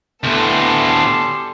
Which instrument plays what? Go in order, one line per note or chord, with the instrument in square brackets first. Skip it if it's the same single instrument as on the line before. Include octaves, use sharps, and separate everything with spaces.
[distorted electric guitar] D2 A2 [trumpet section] G3 G#5 C6 [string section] B3 A4